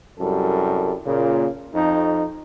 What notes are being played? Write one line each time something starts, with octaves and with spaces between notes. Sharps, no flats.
C2 F#2 G3 A4
A#2 C#3
F2 D#4